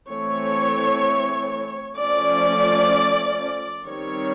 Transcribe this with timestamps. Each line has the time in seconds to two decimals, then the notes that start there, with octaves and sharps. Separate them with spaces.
0.10 E3 A3 C4 C#5
1.98 F3 A3 C#4 D5
3.86 D#3 G3 C4 C#5